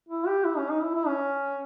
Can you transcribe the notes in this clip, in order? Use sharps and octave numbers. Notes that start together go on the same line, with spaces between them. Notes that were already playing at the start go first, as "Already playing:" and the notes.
E4
G4
E4
C#4
D#4
E4
E4
C#4